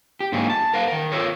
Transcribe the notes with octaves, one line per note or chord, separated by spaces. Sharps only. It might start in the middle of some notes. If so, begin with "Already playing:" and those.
G4
G#2 D3 F#3 A#3 D#4 G#4
A5
A#4 F5 F#5
D#3 A#4
F4 A4 A#4 C#5